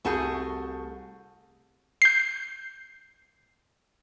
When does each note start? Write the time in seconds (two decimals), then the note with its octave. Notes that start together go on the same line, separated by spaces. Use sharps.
0.05 C2 A3 F#4 G#4 A5 G6
2.02 G6 C7